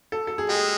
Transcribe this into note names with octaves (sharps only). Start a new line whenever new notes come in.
A4
A4
G#4
G#3 G4